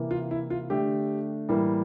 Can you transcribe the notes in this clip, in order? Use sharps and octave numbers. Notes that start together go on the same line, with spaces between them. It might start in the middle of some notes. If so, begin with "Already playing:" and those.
Already playing: C3 E3 A#3
F4
E4
F4
D3 A3 D4 G4
A2 E3 G3 A#3